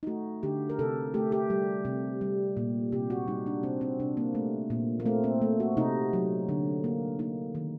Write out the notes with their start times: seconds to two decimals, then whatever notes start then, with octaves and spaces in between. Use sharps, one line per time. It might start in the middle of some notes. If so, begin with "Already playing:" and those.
0.03 D#4
0.07 A3 F#4
0.43 D3 G4
0.70 A#4
0.79 C3 A4
1.14 A3 G4
1.32 G4
1.50 G3
1.85 C3
2.21 G3
2.57 A#2
2.92 C3 G4
3.10 F#4
3.28 G3 D#4
3.46 D4
3.63 C3 C4
3.81 C4
4.00 C3 D4
4.17 A#3
4.35 A3
4.70 A#2
5.00 A#3
5.06 A3 C4
5.24 C4
5.42 A3
5.60 F#4
5.77 C3 D#4
6.13 F#3
6.49 D3
6.84 A#3
7.19 A#3 D#4
7.55 D#3